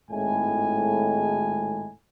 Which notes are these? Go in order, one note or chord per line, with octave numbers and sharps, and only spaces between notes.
G#1 A2 G#3 G#5